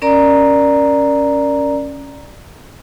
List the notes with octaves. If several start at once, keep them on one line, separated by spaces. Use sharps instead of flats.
C#4 A#4 D5 A#5